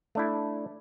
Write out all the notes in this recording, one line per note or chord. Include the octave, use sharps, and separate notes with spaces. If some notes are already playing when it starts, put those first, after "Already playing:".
A3 D4 E4